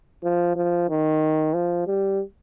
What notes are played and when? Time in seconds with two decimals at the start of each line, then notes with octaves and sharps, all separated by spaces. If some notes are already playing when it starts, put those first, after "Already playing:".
0.23 F3
0.56 F3
0.89 D#3
1.54 F3
1.87 G3